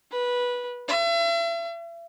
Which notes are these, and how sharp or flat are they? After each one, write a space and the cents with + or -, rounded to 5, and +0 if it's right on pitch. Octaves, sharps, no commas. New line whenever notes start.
B4 -15
E5 +40